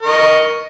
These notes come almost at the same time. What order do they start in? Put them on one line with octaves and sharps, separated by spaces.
A#4 C#6 D#5